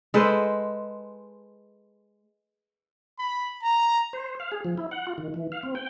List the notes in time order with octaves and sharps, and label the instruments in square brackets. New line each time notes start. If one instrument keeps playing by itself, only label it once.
[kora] G#3 A4 B4 C5
[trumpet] B5
A#5
[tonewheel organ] C5
F5
G#4
F3
E4
F#5
F4
D#3
E3
F5
C4
G5